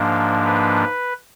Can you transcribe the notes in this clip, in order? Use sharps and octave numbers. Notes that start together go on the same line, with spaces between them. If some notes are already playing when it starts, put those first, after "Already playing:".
Already playing: G#2 F3 A#3 D4
B4